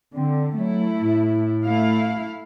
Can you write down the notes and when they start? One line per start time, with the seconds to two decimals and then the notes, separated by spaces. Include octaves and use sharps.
0.14 D3 C4
0.57 F#3 A3 E4
1.02 A2
1.64 A3 E4 F5